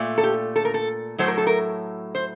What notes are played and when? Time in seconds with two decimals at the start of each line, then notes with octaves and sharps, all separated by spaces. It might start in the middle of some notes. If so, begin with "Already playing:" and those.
Already playing: A#2 A3
0.18 A4
0.23 G4
0.56 A4
0.65 A#4
0.74 A4
1.18 A2 F#3 A3 C5
1.28 A#4
1.38 A4
1.47 A#4
2.15 C5